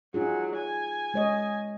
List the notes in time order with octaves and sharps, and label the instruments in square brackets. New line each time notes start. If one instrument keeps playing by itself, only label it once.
[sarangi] F#3 [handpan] D#4 F4 G#4
[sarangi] G#5
[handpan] G#3 C#5 D#5